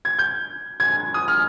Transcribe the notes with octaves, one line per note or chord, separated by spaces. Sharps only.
G#6
G6
G#6
D#6
F6